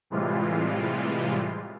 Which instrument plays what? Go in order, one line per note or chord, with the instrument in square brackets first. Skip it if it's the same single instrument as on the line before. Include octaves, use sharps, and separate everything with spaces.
[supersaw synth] A2 C3 E3 G3 G#3 F4